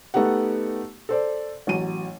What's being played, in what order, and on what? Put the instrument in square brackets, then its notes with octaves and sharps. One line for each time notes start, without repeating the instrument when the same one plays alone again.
[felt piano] A3 B3 D#4 G4 F#5
A4 C5 D5
A1 F#3 D#7